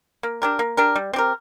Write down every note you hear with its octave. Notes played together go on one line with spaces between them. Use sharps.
A#3
D4 G4 A#4
A#3
D4 G4 A#4
G3
C4 G4 A#4